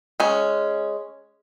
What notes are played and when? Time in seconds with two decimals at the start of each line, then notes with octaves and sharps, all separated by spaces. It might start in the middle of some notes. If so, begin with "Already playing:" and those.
0.20 G#3 C#4